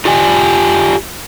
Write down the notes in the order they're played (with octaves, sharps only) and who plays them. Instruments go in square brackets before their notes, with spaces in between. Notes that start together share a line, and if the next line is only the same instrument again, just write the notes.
[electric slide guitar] F4 G4 D5 G#5